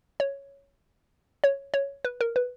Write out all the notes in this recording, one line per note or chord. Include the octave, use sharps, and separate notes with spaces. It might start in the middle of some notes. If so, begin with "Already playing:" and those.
C#5
C#5
C#5
B4
A#4
B4